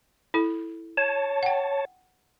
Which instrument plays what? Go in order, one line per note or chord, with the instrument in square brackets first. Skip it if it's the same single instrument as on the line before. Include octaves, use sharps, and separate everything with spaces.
[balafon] E4 A4
[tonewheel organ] C#5 A5
[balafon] F#5 G5